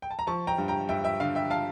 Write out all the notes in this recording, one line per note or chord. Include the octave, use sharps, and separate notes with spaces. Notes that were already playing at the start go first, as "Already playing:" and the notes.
G5
A5
A#5
F3 A5 C#6
G5 A#5
G2
G5 A#5
G2 E5 G5
E5 G5
D3 F5
E5 G5
F5 A5